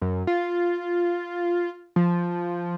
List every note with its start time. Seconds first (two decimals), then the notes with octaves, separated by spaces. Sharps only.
0.01 F#2
0.27 F4
1.96 F3